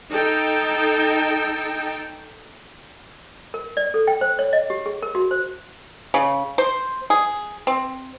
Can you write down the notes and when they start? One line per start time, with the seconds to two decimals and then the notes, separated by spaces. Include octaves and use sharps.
0.11 D#4 A4 G5
3.54 A#4
3.77 D5
3.94 A4
4.07 G5
4.21 C5
4.39 C#5
4.53 D#5
4.70 G4
4.86 G#4
5.03 A#4
5.15 F#4
5.31 C5
6.14 C#3
6.58 C5
7.10 G#4
7.67 C4